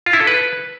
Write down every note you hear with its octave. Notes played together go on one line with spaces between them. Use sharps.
F4
E4
A4
B4